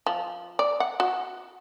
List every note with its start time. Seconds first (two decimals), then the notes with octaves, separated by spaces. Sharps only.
0.06 F3
0.59 D5
0.80 F#5
1.00 F#4